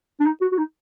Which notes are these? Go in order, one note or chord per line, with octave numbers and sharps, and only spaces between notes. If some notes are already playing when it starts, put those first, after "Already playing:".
D4
D#4
F#4
F#4
D#4